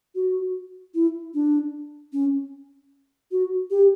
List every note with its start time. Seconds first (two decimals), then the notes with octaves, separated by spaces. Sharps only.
0.15 F#4
0.95 E4
1.34 D4
2.13 C#4
3.32 F#4
3.71 G4